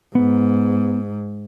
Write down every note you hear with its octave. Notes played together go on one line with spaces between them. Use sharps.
G#2 B3